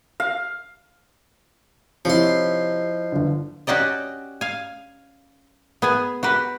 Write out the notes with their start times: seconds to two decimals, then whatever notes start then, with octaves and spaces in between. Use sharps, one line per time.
0.20 F5
2.05 C3 F3 D#4 E4 C5 C#5 D#5 C6
3.12 G1 D3
3.67 C#4 F#4 G4 D5 D#5
4.41 F5 G#5
5.82 B3 G#4 G#5
6.23 F#4 G4 B4